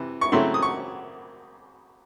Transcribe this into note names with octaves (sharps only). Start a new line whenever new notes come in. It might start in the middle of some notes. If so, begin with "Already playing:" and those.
Already playing: C3 E3
C#6
C#3 F#3 A3 C4 E4 C6
D#6
C#6